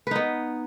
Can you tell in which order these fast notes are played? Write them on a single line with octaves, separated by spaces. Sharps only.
B4 D#4 B3